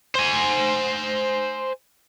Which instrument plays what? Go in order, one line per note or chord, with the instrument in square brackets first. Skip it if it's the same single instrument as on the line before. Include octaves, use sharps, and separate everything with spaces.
[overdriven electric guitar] C5 G#5